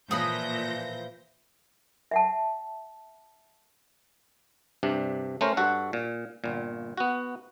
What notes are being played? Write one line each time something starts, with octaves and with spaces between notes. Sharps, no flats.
A#2 E3 F3 B4 D#6 G6 A#6
E5 F#5 A5
G2 C3 D4
A3 C#4 A#4 C5
G2 F#4 A4 F#5
A#2
G1 A#2
B3 F#4